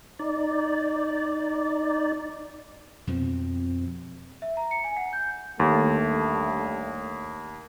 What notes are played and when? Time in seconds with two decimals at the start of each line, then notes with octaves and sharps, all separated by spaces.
0.19 D#4 D5
3.07 F2 B2 F3 C4
4.42 E5
4.57 A#5
4.71 C#7
4.84 G#5
4.97 F#5
5.13 G6
5.60 D#2 D3 G3 A3